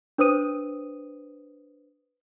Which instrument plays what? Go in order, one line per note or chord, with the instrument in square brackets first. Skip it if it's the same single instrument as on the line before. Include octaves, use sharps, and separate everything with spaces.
[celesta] D4 B4 C5 D#6 D#7